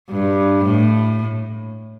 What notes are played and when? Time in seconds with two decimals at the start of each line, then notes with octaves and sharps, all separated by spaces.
0.10 G2
0.64 A2